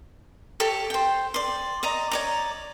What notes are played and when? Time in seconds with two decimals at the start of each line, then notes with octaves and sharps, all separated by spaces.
0.60 G4 A4 C#5
0.90 C5 G5
1.34 D5 C6
1.83 D5 D#5 A#5
2.11 C#5 D5 A#5